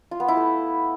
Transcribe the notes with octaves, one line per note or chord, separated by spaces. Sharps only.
F4
B3
E4
A3